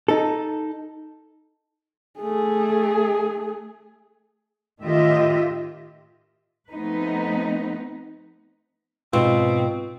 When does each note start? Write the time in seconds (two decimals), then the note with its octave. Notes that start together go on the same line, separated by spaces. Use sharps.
0.08 D#4 A4
2.20 A3 G#4
4.82 A2 D#3 F4 G4 D#5 E5
6.70 F3 A3 B3 C4 D#4 B4
9.13 G#2 B2 C4 F4